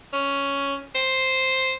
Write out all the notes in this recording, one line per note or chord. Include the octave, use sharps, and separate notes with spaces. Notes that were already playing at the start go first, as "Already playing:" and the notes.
C#4
C5